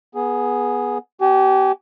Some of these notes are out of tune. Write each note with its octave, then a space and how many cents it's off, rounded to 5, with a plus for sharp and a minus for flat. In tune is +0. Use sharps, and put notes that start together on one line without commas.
B3 -15 G#4 +0
B3 +0 G4 -30 G#5 +0